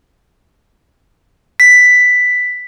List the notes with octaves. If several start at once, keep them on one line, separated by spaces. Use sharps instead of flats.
B6